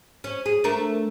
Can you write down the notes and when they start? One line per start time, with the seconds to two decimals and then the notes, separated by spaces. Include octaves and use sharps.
0.24 C#4
0.46 G#4
0.64 A3 D4 A#4